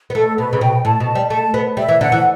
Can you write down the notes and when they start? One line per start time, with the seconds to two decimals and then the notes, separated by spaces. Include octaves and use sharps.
0.10 B3
0.14 A3 A4
0.37 B2 B4
0.53 C#3
0.60 B2 G5
0.85 A2 A5
1.00 B2
1.15 G3
1.30 A3 A5
1.54 B3
1.77 G3 E5
1.88 E3
2.01 D3 F#5
2.12 E3